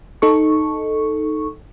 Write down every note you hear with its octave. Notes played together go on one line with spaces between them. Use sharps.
D#4 A4 C#6